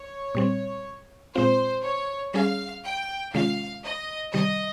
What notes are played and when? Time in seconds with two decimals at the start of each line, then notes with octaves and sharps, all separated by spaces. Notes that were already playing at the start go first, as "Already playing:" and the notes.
Already playing: C#5
0.35 A#2 G3 C4
1.35 A#2 G#3 C4 F4 C5
1.84 C#5
2.34 G3 C#4 G#4 F5
2.84 G5
3.34 C3 D#3 G#3 C#4 F4 F5
3.83 D#5
4.34 C3 D#3 G3 D#5